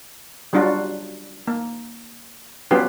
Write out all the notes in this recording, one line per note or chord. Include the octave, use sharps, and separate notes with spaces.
F#3 G3 D4 F4 F#4
A#3
F#3 B3 C#4 F4 G4 B4